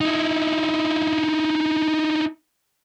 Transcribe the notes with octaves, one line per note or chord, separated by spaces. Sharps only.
D#4 E4